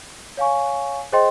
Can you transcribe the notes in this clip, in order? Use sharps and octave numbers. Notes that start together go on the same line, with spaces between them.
C#5 F5 G#5 C#6
G#4 C5 D#5 G5 C6